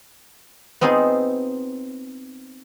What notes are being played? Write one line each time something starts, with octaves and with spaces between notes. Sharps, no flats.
B3 C4 D#4 F4 G#4 C5